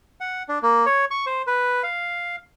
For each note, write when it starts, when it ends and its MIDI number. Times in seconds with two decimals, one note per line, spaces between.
0.20 0.43 78
0.49 0.59 62
0.62 0.86 58
0.86 1.05 73
1.11 1.25 85
1.26 1.42 72
1.47 1.83 71
1.83 2.36 77